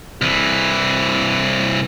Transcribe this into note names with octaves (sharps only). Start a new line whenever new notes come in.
C2 E3